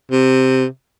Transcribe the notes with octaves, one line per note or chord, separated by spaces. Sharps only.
C3